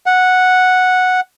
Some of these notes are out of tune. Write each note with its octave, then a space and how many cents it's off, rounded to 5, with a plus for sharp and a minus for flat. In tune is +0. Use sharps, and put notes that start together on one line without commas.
F#5 -5